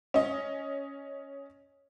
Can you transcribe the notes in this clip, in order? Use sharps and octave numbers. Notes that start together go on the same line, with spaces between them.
C#4 D#5